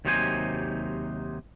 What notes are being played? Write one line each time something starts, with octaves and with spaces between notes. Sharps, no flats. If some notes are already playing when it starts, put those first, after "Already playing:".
D#2 C3 F#3 D#4 C5 G#5